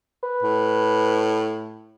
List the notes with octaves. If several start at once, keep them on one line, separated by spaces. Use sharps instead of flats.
B4
A2